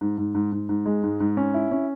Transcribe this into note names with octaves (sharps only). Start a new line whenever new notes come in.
G#2
G#2
G#2
G#2
G#2
G#3
G#2
G#2
C#4
E4
C#4